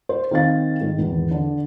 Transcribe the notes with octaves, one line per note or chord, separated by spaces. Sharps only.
C5
D#3 C4 F5 A6
G#2 D#3
G#1 E2
D3